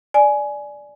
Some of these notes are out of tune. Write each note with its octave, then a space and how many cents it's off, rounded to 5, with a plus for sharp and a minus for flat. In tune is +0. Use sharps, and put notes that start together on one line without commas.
D5 +0 G#5 +15